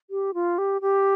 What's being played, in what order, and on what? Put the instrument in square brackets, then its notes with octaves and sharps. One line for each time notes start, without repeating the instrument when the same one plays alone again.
[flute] G4
F4
G4
G4